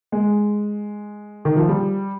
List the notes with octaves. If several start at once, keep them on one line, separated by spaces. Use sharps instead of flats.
G#3
D#3
F3
G3